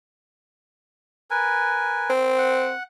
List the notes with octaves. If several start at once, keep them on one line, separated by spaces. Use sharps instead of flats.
A#4 B4 G#5
C4
F#5